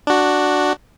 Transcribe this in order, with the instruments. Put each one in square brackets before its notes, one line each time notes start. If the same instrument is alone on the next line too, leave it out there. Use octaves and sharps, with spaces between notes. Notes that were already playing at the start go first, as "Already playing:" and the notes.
[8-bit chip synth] D4 F#4